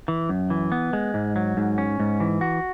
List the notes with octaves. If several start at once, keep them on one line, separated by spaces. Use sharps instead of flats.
E3
F#2
E3
B3
G#3
G#2
F#3
G#2
C#4
G#2
E3
F#4